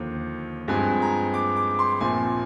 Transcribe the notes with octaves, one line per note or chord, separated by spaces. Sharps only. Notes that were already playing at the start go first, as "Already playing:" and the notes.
Already playing: D#2 D3 F3 D6
G2 F3 G#3 C4 G#5
A#5
D6
D6
C6
A#1 A#2 F3 C4 G#5